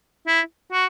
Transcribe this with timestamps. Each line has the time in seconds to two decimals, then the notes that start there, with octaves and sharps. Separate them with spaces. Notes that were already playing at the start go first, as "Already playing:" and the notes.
0.27 E4
0.72 F#4